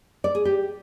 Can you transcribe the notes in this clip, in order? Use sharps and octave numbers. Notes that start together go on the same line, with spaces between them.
D5
G#4
G4